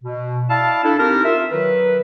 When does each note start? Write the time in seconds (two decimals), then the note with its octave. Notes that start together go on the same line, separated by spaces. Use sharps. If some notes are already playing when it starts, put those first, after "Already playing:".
0.04 B2
0.50 E4 D5 F5 A5
0.84 D4 E4 A4
0.99 C4 D#4 G4 A#4
1.25 F4 E5
1.51 D#3 F#3 A#4 B4